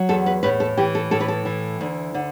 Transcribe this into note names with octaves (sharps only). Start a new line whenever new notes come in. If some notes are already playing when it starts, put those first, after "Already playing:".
Already playing: F#3
E2 A4
B4
A2 B4
A4
E3 G4
A4
A2 A4
B4
A4
E3
D2
D3